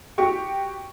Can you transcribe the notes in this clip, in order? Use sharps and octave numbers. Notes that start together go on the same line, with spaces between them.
F#4 G4 C#6